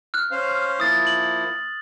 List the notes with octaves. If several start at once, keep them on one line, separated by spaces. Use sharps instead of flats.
F6 F#6
C#4 C5 F5
F3 A#3 E4 D#6 A6
F#7